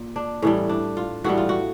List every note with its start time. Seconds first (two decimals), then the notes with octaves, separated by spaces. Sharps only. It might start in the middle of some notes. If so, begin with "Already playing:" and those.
Already playing: A#2
0.16 D4
0.42 A2 E3 G3 C#4
0.69 D4
0.97 F4
1.24 A2 E3 G3 F#4
1.37 F4
1.49 F#4